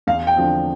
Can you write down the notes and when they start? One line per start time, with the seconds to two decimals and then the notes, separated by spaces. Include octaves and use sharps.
0.07 E2 F5
0.27 G5
0.37 D3 F3 C4